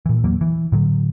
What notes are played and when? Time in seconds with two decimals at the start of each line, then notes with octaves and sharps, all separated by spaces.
0.06 A#2 E3
0.24 E2 F#3 A#3
0.41 E3
0.72 A2 D3 F#3